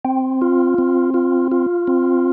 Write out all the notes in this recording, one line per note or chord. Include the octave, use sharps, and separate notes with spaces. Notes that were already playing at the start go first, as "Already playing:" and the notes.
C4
F4
C4
F4
F4
C4